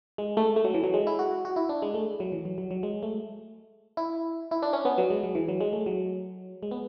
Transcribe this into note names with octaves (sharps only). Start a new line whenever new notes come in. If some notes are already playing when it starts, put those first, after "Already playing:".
G#3
A3
A3
F#3
E3
F#3
G#3
E4
F#4
F#4
E4
D4
G#3
A3
F#3
E3
F#3
F#3
F#3
G#3
A3
E4
E4
D4
C#4
B3
F#3
G#3
F#3
E3
F#3
G#3
A3
F#3
G#3
B3